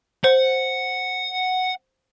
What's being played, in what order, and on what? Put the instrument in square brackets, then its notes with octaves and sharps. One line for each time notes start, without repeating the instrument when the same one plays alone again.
[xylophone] C5 [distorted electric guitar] F#5